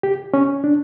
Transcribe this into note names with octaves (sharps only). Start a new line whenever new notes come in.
G4
C#4
D4